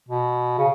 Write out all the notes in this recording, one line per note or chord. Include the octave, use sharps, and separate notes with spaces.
B2
C#3